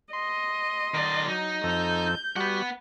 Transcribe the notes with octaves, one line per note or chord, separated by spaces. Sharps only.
D#5 C6
D#3 D5
F#3 D#4
F2 A4 G6
G3 B3 F#4 F#5